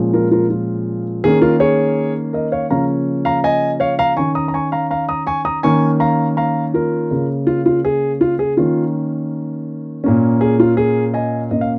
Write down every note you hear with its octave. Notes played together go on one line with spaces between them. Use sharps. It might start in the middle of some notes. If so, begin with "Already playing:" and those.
Already playing: A#2 F3 G#3 C#4
F4 A#4
F4 A#4
F4
D#3 A#3 C#4 G#4
F4 A#4
G#4 C#5
A#4 D#5
C#5 F5
C#3 F3 A#3 C#4 F5 A#5
F5 A#5
D#5 G#5
C#5 F5
F5 A#5
D#3 C#4 G#5 C#6
A#5 D#6
A#5
G#5 C#6
F5 A#5
F5 A#5
A#5 D#6
G#5 C#6
A#5 D#6
D#3 A#3 C#4 G#5 C#6
F5 A#5
F5 A#5
F4 A#4
C#3 A#3 C#4
F4
F4
G#4
F4
G#4
D#3 A#3 C#4 F4
A#2 A#3 C#4
G#4
F4
G#4
D#5 G#5
A#2 A#3 C#4 D#5
F5